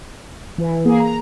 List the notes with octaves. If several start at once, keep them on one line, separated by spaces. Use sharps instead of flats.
E3
A#3 G#4
A#5